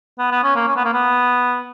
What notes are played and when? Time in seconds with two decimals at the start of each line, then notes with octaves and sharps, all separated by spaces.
0.19 B3
0.31 B3
0.43 C#4
0.56 A#3
0.67 C#4
0.76 B3
0.85 A#3
0.93 B3